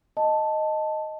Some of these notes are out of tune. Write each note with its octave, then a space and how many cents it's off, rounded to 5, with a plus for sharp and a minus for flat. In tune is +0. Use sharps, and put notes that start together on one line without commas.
D#5 +0 A5 +0